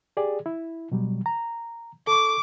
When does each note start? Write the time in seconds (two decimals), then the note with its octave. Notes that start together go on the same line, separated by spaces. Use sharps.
0.17 G4 G#4 D5
0.46 E4
0.92 B2 F#3 G3
1.26 A#5
2.07 A4 C#6 D6